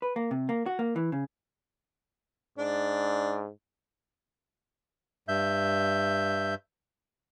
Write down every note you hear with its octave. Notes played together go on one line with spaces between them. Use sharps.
B4
A#3
C3
A#3
F#4
A#3
E3
C#3
G#2 D4
G2 E5 G6